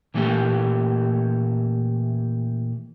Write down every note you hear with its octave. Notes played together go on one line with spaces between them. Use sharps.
A#2 E3 A3 C#4 G4